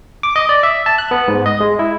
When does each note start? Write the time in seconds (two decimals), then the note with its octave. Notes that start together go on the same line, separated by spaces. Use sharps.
0.23 D6
0.36 D#5
0.49 D5
0.63 E5
0.86 A5
0.98 F#6
1.11 B3
1.28 G#2
1.46 D#5
1.60 G#3
1.79 E4